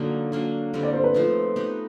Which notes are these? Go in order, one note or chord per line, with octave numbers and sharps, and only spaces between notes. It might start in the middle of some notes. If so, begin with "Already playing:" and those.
Already playing: D3 F#3 A#3 D#4 F#4
F#3 A#3 D4
D3 G3 C4
D5
C5
B4
F3 A3 C4 D#4
B3 D#4 G4